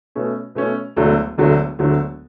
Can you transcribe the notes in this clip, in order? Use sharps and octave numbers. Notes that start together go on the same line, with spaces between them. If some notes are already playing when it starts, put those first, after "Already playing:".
B2 A3 C#4
B2 A3 C#4
E1 D2 D3 F#3 A3
E1 D2 D3 F#3 A3
E1 D2 D3 F#3 A3